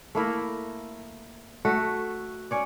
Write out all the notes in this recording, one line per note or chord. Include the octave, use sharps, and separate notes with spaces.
A3 A#3 E4 A#4
A3 F#4
C#4 C#5 D5